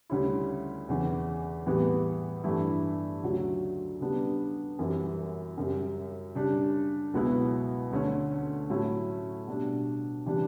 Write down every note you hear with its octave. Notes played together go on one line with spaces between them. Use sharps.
D2 C#3 G3 C#4 E4
E2 C#3 E3
A2 E3 G3 B3
G2 E3 A3 E4
D2 C#3 F#3
C#3 G3 B3 D4
F#2 E3 G3
F#2 C#3 G3
C#3 G3 D4
C#2 B2 F#3 B3 E4
D2 D3 A3 C#4
A2 F#3 A3 C#4 E4
B2 G3 D4
C#3 E3 G3 D4